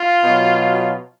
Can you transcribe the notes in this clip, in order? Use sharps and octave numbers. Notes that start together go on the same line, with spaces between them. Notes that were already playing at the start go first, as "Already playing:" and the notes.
Already playing: F4
B2 F#3